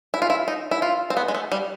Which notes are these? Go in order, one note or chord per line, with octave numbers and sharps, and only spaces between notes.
E4
F4
E4
D#4
E4
F4
C4
B3
G#3
A3
G3